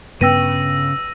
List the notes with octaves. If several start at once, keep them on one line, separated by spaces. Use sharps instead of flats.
G2 C#3 B3 B4 G5 E6 A#6 D#7